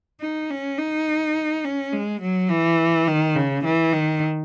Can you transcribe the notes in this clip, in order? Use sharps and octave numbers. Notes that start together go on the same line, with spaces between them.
D#4
C#4
D#4
C#4
G#3
F#3
E3
D#3
C#3
E3
D#3